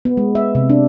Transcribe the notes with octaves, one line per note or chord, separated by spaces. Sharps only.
B3
G#3
E5
C3
D4